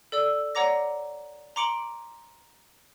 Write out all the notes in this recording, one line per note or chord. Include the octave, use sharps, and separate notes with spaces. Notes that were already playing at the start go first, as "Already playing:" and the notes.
A4 D5 E6
C#5 D5 F#5 A#5 D6 A#6
A#5 C6 D6 C#7 D7 F#7